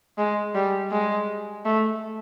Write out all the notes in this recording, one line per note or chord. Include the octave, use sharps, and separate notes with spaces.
G#3
G3
G#3
A3